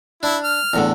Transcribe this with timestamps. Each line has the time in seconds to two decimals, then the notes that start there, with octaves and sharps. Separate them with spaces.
0.23 D4 E4
0.44 F6
0.74 E2 A2 D3